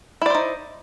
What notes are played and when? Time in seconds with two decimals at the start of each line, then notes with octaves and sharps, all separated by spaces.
0.22 E4
0.26 D5
0.30 C5
0.35 D#4